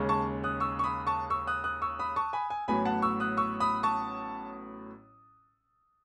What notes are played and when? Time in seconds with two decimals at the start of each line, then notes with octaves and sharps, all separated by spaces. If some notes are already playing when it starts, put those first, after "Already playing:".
Already playing: D#2 C#3 G#3 C#4
0.09 A5 C#6
0.44 D#6 F#6
0.60 C#6 E6
0.79 C#6
0.84 B5 D#6
1.07 A5 C#6
1.30 C#6 E6
1.47 D#6 F#6
1.64 D#6 F#6
1.82 C#6 E6
1.99 B5 D#6
2.16 A5 C#6
2.33 G#5 B5
2.50 G#5
2.68 A1 A2 F#3 B3 G#5 B5
2.85 F#5 A5
3.02 C#6 E6
3.20 D#6 F#6
3.37 C#6 E6
3.60 B5 D#6
3.83 A5 C#6